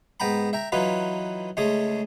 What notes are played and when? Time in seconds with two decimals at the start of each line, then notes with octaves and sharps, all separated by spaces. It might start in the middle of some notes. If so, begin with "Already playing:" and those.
0.20 G#2 B3 G5 A#5 B5
0.53 E5 G5 A#5
0.72 E3 F#3 D#4 F4 B4
1.57 C#2 G#3 A3 C#4 G#4